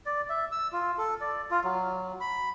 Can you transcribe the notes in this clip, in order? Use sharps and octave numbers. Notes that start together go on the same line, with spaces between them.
D5
E5
E6
F4
A4
D5
F4
F#3
B5